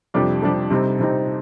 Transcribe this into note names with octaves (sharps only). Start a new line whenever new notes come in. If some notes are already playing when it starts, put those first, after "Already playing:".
F2 C3 G3 D4 G4
F2 C3 G3 D4 G4
C3 G3 C4 D#4
C3 G3 C4 D#4